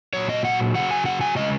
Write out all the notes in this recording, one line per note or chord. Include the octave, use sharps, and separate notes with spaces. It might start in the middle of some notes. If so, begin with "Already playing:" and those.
A#2 F#3 C#5
D#5
F#5
C#3 F#3 F#5
G#5
F#5
G#5
C#3 G#3 D#5